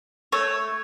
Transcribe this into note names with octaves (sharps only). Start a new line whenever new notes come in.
A3 C#5